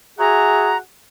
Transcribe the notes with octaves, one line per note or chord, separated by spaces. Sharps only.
F#4 G#4 E5 F#5 G#5 A#5